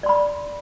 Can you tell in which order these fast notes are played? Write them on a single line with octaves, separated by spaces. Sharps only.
D5 C6 B5